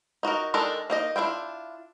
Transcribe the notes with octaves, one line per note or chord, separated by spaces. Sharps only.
D#4 F#4 A4 A#4
D#3 G#3 D4 A4 A#4
A#3 D#4 D#5
D4 E4 F4 G5